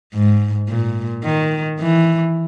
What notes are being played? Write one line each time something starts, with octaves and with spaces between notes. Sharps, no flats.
G#2
A#2
D#3
E3